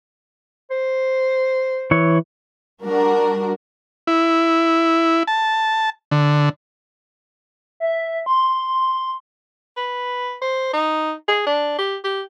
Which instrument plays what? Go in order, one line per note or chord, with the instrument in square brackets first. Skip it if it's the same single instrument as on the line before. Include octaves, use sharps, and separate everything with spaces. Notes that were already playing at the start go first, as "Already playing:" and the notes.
[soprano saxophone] C5
[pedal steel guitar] E3 C#5
[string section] G3 D4 F#4 A#4
[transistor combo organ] E4
A5
D3
[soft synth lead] E5
C6
[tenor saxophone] B4
C5
D#4
G#4
D4
G4
G4